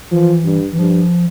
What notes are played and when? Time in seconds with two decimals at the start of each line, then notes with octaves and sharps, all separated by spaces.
0.11 E3 F3
0.45 G2
0.72 E3
0.78 G2 F3